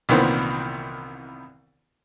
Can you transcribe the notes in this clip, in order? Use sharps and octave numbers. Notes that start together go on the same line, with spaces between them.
C2 A#2 D#3 E3 B3 C5